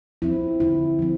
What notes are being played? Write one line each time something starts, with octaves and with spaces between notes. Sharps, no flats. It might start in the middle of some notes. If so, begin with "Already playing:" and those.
F3 C4 E4
D3 E4
F3 C4